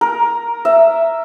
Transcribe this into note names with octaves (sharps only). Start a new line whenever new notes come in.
A#4
E5